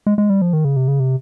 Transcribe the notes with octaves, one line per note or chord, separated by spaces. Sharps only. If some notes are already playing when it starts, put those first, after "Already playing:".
G#3
G#3
G3
F3
D#3
C#3
C3
C#3
C3